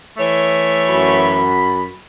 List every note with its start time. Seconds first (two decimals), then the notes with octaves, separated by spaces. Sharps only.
0.17 E3 A3 C#5
0.88 F#2 F#4 B5